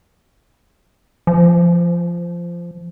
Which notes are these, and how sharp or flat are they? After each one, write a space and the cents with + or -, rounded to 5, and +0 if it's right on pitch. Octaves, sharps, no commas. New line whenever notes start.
F3 -15